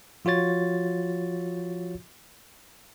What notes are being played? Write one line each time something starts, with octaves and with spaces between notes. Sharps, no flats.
F3 F4 F#4 C#5 A6